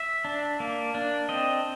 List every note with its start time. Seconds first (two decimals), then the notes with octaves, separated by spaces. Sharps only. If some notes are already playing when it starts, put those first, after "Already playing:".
Already playing: E5
0.25 D4
0.60 A#3
0.94 D4
1.29 C4 D#5